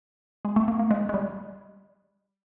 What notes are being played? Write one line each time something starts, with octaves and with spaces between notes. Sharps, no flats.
G#3
A3
A#3
A#3
G#3
G#3
G3